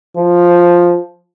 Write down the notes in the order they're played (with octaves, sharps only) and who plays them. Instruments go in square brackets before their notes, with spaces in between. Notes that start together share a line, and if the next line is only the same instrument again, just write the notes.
[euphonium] F3